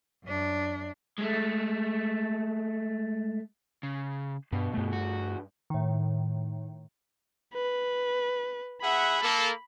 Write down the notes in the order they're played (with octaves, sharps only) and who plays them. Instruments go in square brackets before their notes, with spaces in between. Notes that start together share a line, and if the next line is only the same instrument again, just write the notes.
[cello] F#2 D4
[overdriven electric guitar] G#3 A3
C#3
[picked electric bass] G2 [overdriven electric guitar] B2
[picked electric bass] G2 A3
[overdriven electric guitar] F#4
[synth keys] A2 D#3
[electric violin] B4
[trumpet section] G#4 E5 F#5 [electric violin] B5
[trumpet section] A#3 A4